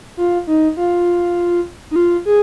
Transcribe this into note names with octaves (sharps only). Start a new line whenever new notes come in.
F4
D#4
F4
D#4
F4
G#4